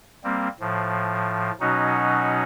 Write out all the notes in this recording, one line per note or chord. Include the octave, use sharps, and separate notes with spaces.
G3 A#3 C4
A2 F3
B2 F#3 C#4 D#4 F#4